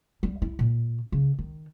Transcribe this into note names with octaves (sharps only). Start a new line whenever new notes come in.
G3
E4
A#2
C#3
D#3